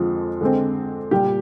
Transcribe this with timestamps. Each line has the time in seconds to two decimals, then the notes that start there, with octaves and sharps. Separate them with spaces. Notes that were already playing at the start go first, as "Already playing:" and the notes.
Already playing: F2 D3 F3 G#3 C4
0.41 D3 G#3 C4
1.11 A#2 G3 A#3 G4